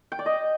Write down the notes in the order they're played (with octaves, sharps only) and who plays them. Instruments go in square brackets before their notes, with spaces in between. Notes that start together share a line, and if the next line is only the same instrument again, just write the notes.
[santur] G5
D5
D#5